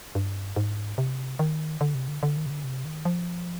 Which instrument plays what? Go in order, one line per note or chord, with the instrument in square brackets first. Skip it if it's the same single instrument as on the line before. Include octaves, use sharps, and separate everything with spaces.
[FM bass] G2
G#2
C3
D#3
D3
C3
D3
D3
D#3
C3
D3
C3
D#3
F3